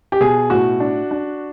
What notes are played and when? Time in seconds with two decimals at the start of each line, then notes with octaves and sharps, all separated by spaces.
0.12 G4
0.20 B2 G#4
0.50 A2 F#4
0.80 D4
1.11 D4